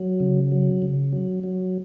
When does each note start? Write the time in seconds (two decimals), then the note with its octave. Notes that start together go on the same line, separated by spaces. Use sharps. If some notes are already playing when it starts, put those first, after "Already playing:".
Already playing: F#3
0.20 C#3
0.52 F#3
0.82 C#3
1.13 F#3
1.44 F#3